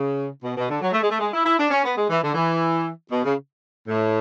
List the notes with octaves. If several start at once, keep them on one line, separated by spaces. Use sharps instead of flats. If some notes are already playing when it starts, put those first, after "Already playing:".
Already playing: C#3
B2
B2
D3
F#3
A3
G#3
A3
G#3
E4
E4
D4
C#4
B3
G#3
E3
D3
E3
B2
C#3
A2